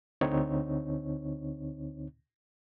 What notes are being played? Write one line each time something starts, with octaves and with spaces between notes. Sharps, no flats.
D2 D3 C4 D#4 C#5